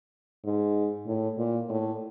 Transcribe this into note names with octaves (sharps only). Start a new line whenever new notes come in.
G#2
A2
A#2
A2